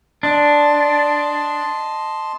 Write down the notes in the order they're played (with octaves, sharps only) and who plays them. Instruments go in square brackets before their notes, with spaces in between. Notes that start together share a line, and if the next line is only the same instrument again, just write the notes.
[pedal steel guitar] D4 [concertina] D#5 A5 C6